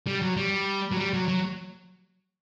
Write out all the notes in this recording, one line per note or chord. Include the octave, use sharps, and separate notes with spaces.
G3
F#3
G3
F#3
G3
F#3
F#3